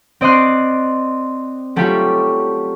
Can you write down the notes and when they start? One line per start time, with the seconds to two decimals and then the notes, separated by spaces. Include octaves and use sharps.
0.21 C4 D5 D#5 C6 F#6
1.76 F#3 G3 A3 C#4 F4 G4